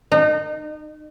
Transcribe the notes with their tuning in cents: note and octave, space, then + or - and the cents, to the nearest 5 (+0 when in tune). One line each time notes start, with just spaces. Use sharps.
D#4 -30